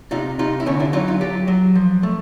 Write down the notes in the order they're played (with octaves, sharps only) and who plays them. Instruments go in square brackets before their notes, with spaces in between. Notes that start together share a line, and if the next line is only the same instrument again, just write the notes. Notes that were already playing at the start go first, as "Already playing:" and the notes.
[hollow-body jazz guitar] C3 D#4 F4
C3 D#4 F4
E4
D3 C#4 D#4
D4 E4
F#3 D#4 F4
D#4 F4
F#3 F4 G4
F#3
F3
A3